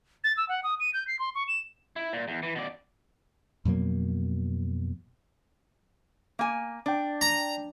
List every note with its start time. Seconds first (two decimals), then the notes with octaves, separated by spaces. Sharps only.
0.24 A6
0.37 E6
0.49 F#5
0.63 D#6
0.80 D#7
0.94 G6
1.08 C7
1.19 C6
1.35 C#6
1.48 E7
1.96 E4
2.13 A#2
2.28 E2
2.43 E3
2.55 B2 D5
3.65 F2 B2 F#3 A#3
6.39 A#3 G#5
6.86 D4 D5 G5
7.21 A#5